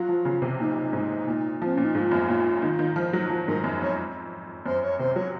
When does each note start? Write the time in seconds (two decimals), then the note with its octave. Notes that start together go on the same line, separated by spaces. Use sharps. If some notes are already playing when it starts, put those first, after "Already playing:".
Already playing: F#3 F4
0.08 F3
0.25 C#3
0.42 C3
0.60 A#2 D#4
0.93 G#2
1.28 A#2
1.62 F3 C4
1.75 A#2 C#4
1.84 D#4
1.95 G#2 F4
2.11 F#2
2.28 A#2
2.62 D#3
2.79 D#3
2.96 F3
3.13 F#3
3.30 F3
3.48 G#2 A#4
3.64 F#2
3.81 F2 C#5
4.66 F#2 C5
4.83 C#5
4.99 C3 C5
5.16 F#3 C#5